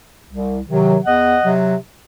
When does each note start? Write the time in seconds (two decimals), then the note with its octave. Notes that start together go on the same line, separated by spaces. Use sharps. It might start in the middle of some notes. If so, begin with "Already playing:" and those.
0.28 C2
0.66 C3 D#3 F#3
1.04 E2 D#5 F#5
1.43 C3 F#3